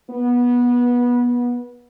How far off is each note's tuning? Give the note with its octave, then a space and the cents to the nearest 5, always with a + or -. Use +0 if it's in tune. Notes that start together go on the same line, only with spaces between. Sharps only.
B3 -20